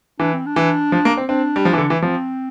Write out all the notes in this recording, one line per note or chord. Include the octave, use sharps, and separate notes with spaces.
E3 D4
C4
D4
E3
F3
A#3
C4
C4 D4
G3
F3
E3
D3
E3
F3 C4